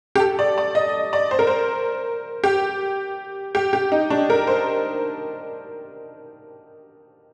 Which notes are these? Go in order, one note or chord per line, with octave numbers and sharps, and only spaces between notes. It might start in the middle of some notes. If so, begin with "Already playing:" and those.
G4
A4
D5
D5
D#5
D5
C5
A#4
C5
G4
G4
G4
D#4
D4
A#4
C5